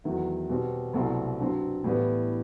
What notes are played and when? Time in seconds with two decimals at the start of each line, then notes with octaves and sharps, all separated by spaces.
0.04 E2 D#3 F#3 A3 E4
0.50 B2 G3 C4
0.93 C2 B2 F#3 A3 C4
1.39 G2 F#3 C4
1.84 A2 E3 G3 B3